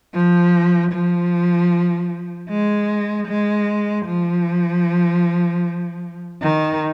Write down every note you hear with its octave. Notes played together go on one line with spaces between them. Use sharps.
F3
F3
G#3
G#3
F3
D#3